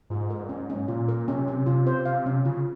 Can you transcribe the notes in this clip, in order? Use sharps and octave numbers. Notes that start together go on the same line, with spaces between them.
G#2 F4
A#4
G2
G#2 C#4
C#4
A#2 F4
A#4
C3 C#4
C#4
C3 F4
C5
C3 F5
C#4
C#3 F4